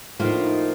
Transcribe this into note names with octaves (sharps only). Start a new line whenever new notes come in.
A2 F3 A#3 D#4 F4
D4
D#4